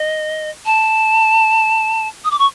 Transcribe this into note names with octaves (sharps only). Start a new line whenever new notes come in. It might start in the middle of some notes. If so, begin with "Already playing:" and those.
Already playing: D#5
A5
D#6
D6
C#6